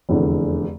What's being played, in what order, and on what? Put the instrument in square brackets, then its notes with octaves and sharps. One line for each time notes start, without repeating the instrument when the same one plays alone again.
[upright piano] F1 E2 D3